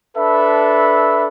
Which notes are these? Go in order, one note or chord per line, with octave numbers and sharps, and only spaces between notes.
D4 A4 B4 E5 B5